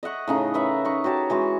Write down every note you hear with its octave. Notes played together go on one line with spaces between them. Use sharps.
D#5 E5 F#5 C#6
A2 C#3 D#4
A#4 B4 E5 F#5
D#4 C#6
F#4 G4 C#5 A5
E3 G#3 F#4 C#6